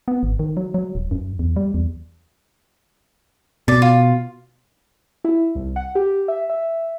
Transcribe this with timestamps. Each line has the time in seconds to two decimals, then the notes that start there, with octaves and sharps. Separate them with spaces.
0.08 B3
0.23 G#1
0.39 D#3
0.57 F#3
0.74 F#3
0.95 D#1
1.11 F#2
1.39 E2
1.56 G3
1.74 E2
3.68 B2 D5
3.82 F4
5.24 E4
5.55 C2
5.76 F#5
5.95 G4
6.28 E5
6.50 E5